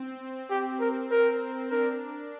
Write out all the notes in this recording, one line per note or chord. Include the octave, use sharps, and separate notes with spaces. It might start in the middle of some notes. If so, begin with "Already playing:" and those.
Already playing: C4
G4
A#4
A#4
D4 A#4